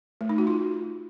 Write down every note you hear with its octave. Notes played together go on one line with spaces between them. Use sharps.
A3
D#4
F#4
F4